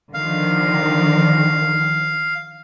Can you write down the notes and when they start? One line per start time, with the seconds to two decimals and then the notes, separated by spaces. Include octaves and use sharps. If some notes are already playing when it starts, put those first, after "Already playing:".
0.14 D3 D#3 F3 F5